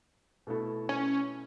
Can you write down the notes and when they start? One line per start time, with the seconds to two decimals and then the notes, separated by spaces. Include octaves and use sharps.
0.47 B2 A3 E4 A4
0.89 C#4